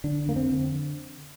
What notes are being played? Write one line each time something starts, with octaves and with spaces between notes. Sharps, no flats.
D3 D4
F2 A#3
C4
D3